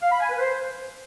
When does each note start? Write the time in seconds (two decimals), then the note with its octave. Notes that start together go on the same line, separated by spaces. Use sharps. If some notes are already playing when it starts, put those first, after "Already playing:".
0.01 F5
0.11 B5
0.20 G#5
0.30 B4
0.39 C5